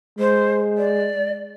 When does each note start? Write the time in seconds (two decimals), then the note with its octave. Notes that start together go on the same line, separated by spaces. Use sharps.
0.19 G#3 C5
0.77 D5